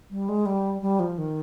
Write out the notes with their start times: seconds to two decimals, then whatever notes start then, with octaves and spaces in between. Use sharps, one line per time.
0.11 G3
0.29 G#3
0.46 G3
0.82 G3
1.00 F3
1.18 D#3